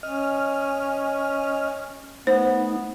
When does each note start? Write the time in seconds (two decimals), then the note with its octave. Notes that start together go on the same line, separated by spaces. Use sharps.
0.03 C#4 D#5 F6
2.27 A3 B3 D#4 C5